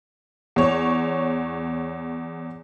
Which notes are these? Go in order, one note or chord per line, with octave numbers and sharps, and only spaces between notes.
E2 C#5